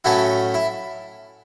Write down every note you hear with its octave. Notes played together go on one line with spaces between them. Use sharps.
A2 F#3 A3 C#4 E4
E4